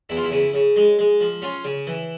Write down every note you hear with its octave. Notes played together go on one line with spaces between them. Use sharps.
E2 E4
F4
E4
C#3
C#3
G#3
G#3
F3
C#4 F4
C#3
E3